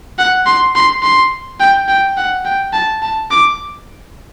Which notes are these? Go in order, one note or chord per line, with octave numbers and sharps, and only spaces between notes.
F#5
C6
C6
C6
G5
G5
F#5
G5
A5
A5
D6